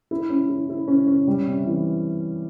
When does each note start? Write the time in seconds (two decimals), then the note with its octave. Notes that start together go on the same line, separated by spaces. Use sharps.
0.11 E4
0.30 C#4
0.49 E4
0.69 E4
0.88 C#4
1.07 C#4
1.27 G3
1.47 C3
1.66 E3